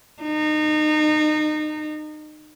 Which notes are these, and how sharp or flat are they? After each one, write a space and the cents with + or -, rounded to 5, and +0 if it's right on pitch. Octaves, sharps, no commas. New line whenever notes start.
D#4 -30